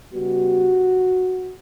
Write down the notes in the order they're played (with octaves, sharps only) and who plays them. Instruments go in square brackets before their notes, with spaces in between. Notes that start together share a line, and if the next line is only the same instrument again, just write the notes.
[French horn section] C#3 G3 B3 F#4